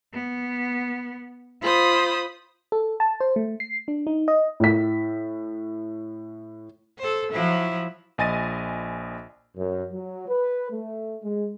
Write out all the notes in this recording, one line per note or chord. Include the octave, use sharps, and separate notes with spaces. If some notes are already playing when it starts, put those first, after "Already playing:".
B3
F4 C5 B5 D#6
A4
A5
C5
A3
C7
D4
D#4
D#5
A2 B6
A4 C5
F3 F#3 E4
A#1 D#5 G#5 A6 A#6 D#7
F#2
F#3
B4
A3
G#3